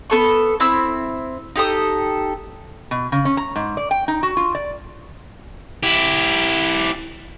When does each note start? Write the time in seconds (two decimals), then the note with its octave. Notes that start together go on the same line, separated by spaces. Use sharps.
0.10 B3 A4 C#6
0.60 C4 E4 E6
1.56 D#4 G4 A4 D#6
2.91 B2
3.12 C#3
3.25 C#4
3.37 A#5
3.56 G#2
3.77 D5
3.91 G5
4.08 D#4
4.23 F#4
4.37 F4
4.55 D5
5.83 E4 G4